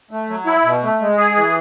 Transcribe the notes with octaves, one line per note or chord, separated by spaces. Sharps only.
A3
F#3
E4
B2
A3
G#3
G#4
E3